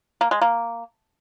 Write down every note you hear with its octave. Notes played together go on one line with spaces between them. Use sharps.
A#3
G#3
A#3